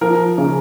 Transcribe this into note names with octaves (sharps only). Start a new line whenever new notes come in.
F3 A#4
C#3